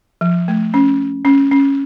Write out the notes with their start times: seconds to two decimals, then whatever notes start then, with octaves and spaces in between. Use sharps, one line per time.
0.21 F3
0.48 A3
0.74 C#4
1.25 C#4
1.52 C#4